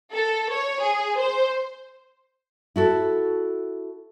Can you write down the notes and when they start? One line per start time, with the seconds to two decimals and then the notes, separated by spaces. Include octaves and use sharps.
0.15 A4
0.50 C#5
0.81 G#4
1.19 C5
2.76 E4 F#4 A4